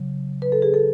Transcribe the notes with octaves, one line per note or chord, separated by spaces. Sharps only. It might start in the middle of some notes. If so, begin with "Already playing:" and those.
Already playing: C#3 F#3
B4
A4
G#4
A4